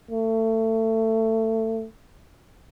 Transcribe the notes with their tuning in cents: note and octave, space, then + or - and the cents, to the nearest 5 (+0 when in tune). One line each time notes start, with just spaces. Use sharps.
A3 +25